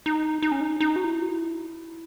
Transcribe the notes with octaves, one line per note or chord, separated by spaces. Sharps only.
D#4
D#4
C#4
D#4
D#4
F#4
E4
F#4
E4